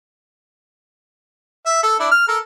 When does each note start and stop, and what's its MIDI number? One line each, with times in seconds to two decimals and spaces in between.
1.66 1.82 76
1.83 1.95 69
2.00 2.09 62
2.00 2.09 64
2.11 2.24 89
2.28 2.38 69
2.28 2.38 70